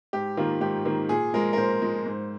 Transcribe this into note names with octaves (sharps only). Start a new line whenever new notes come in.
G#2 G4
D#3 A#3 F4
G#2 G4
D#3 A#3
A#2 G#4
F3 G#3 A#4
A#4
A#2 C5
F3 G#3
G#2